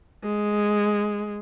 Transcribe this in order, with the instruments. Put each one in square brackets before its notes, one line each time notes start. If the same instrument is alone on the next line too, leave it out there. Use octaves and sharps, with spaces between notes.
[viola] G#3